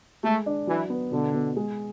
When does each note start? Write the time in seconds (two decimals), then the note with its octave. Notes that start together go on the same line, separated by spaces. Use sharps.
0.23 G#3 A3
0.46 D4
0.67 E3 F#3
0.90 B3
1.11 B2 D3
1.33 B2
1.56 G#3